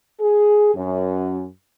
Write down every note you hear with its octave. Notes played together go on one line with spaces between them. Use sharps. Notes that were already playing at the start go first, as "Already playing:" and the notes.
G#4
F#2